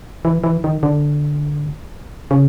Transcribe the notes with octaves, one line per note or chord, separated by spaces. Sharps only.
E3
E3
D#3
D3
C#3